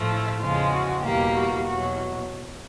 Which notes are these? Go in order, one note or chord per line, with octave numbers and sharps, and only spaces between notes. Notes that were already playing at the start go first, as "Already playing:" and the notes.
Already playing: A2 F3 A3
E4
E2 C#3 F3 G#3 F4
F#4
E2 B2 G3 A#3 G4
F#4
E2 B2 F#3 F#4